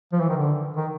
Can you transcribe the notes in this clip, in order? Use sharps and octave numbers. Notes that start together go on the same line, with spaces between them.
F3
E3
D#3
D3
D#3